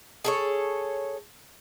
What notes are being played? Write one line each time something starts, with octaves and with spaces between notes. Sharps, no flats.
G#4 A4 C#5